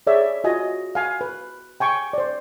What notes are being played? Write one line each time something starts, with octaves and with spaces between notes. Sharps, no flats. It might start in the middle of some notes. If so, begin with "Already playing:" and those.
G#4 C#5 D5 E5
F4 F#4 D#5 G#5
F5 G#5
B4
G5 G#5 C#6
C5 D5